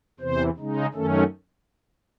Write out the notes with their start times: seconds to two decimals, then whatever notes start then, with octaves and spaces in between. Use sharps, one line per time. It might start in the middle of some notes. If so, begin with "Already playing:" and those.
0.20 E2 C3 E3 C5
0.57 C#3 G#3 D#4
0.94 F#2 D#3 A3 C#4 A4